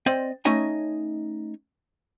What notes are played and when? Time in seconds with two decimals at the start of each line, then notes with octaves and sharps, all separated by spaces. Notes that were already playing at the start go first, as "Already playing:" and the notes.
0.06 C4 C5 D5 D#5
0.45 A3 C#4 D#4 C#5 D#5 G#5